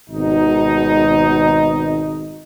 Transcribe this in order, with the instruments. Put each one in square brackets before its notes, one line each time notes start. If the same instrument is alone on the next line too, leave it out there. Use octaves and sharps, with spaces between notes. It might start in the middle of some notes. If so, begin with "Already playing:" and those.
[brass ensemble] G#1 B2 D#4